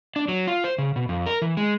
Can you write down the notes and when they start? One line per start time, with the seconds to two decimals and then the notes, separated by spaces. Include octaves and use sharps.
0.16 D4
0.28 F#3
0.47 F4
0.64 C5
0.78 C#3
0.96 B2
1.09 F2
1.26 A#4
1.42 E3
1.57 G#3